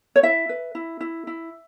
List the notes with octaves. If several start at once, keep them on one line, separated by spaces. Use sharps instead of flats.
C#5
E4 E5
B4
E4
E4
E4